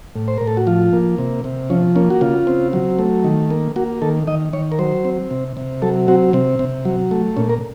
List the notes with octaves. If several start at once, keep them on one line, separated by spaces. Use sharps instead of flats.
A2
C5
A2 A#4
A4
F#4
F3 F4
A#3
C3
C3
F3 C#4
A#3 C#4
F#4
C#3 F4
C4
F#3
A3
D#3
A#3
A#3 F#4
D#3 A4
D#3 D#5
D#3 C#5
A#4
F#3 C5
C4
C3
C3
F#3 A4
C4 F#4
C3 C4
C3
F#3
A3
A#2 C#4
A#4